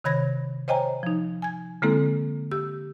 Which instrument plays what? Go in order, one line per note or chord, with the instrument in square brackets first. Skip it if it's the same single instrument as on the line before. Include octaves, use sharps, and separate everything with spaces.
[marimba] C3 D#3 C#5 B5 G#6 A#6
C5 C#5 D#5 G5 G#5 A#5
F3 D#4
G#5 G#6
D3 G#3 A#3 C4 E4 A4
G4 E6